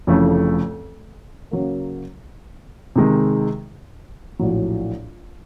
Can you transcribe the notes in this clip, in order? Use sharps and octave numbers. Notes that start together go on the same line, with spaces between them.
F1 F2 C#3 E3 A3
C#3 F#3 A#3
C3 D#3 G#3
A#1 A2 F#3